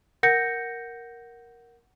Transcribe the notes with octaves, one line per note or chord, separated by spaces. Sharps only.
A#4 F#5 G6 A#6 C#7